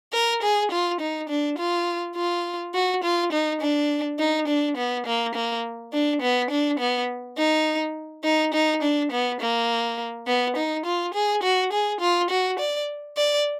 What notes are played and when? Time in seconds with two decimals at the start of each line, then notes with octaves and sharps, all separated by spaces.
0.13 A#4
0.43 G#4
0.71 F4
1.01 D#4
1.29 D4
1.58 F4
2.16 F4
2.74 F#4
3.03 F4
3.33 D#4
3.61 D4
4.19 D#4
4.48 D4
4.77 B3
5.06 A#3
5.35 A#3
5.93 D4
6.22 B3
6.51 D4
6.80 B3
7.38 D#4
8.24 D#4
8.54 D#4
8.82 D4
9.12 B3
9.40 A#3
10.28 B3
10.56 D#4
10.86 F4
11.14 G#4
11.43 F#4
11.72 G#4
12.01 F4
12.30 F#4
12.59 D5
13.17 D5